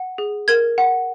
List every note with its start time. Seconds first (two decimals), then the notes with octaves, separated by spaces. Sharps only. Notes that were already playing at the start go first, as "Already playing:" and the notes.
Already playing: F#5
0.18 G#4
0.48 A#4 G#6
0.78 F#5